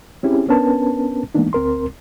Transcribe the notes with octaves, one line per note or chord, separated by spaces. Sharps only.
C4 C#4 E4 G4 G#4
B3 C#4 D4 A#4 B4 A5
E3 G#3 A#3 B3 D4 D#4
D2 C4 A#4 C6